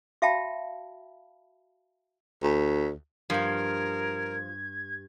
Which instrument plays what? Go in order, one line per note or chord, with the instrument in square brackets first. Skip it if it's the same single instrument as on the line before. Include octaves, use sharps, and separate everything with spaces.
[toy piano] F#4 E5 F5 G5 A5 B5
[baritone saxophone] D2
[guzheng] G2 F5 [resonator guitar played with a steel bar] F3 [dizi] A#4 [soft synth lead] G#6